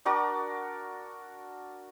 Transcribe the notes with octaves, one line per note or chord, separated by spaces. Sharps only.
D4 F#4 A#4 D5